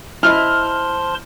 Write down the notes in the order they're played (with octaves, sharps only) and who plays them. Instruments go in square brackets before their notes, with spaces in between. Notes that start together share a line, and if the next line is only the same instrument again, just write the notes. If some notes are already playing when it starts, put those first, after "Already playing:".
[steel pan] E4 D#5 [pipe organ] C5 A5 C6 [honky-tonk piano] F6